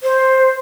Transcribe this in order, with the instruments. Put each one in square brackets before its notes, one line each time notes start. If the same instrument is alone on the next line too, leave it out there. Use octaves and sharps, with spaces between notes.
[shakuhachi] C5